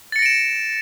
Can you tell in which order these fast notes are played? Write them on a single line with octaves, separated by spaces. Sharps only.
A6 C#7 A#6 D7 E7